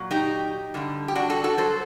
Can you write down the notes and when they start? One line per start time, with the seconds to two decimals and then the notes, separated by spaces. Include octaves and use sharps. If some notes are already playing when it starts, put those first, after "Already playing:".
Already playing: A#2 F#3
0.11 D#4 G4
0.74 G2 D3 G3
1.08 G4
1.15 D4 F#4
1.30 F#4 A4
1.44 F#4 A4
1.57 G2 F#3 A4 C5